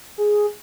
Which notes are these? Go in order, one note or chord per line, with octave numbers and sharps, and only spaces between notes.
G#4